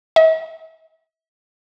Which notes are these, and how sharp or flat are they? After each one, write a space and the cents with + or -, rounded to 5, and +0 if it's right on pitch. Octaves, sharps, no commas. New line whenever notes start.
E5 -40